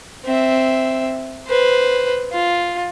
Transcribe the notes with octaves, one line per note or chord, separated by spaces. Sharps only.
C4 E5
B4 C5
F4